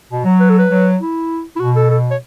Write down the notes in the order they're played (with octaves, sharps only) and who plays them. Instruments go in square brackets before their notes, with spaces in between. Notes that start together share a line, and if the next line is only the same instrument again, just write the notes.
[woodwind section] B2
F#3
[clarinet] B4
A4
B4
[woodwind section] F#3
[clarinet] E4
E4
[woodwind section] B2 [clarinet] F#4
[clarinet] A4
A4
C#5